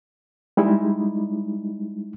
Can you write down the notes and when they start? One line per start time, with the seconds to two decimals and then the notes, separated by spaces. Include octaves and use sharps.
0.57 G3 G#3 D#4 E4